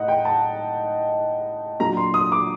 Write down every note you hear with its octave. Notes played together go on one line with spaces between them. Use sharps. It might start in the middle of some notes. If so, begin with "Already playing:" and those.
Already playing: A2 D#4 D#5 F#5
G5
A5
A#2 F#3 A#3 D4 A#5
C6
D#6
D6